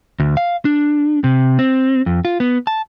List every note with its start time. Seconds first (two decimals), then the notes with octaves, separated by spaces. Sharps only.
0.20 D2
0.37 F5
0.65 D4
1.24 C3
1.59 C4
2.06 F2
2.25 F4
2.40 B3
2.67 A5